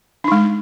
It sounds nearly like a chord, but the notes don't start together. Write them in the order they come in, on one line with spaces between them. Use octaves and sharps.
D4 D#4 G#3